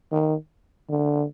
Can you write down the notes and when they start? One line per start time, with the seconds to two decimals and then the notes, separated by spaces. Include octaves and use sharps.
0.12 D#3
0.89 D3